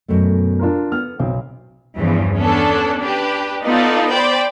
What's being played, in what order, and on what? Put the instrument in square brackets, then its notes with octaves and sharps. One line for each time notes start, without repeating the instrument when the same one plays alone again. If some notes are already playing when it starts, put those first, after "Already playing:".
[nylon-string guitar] F#2 B2 A3
[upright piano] D4 F4 A#4
[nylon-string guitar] B3 [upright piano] F6
[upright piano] B1 [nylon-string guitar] C4
[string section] E2 G2 C#3 E3 F3
B3 C#4 D4 A4
D4 G4 B4
B3 D#4 F4 A4 D5
C5 D5 G5 B5